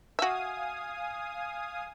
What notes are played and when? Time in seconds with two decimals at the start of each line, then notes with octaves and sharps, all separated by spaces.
0.19 F#4 E5 F5 G#5 D#6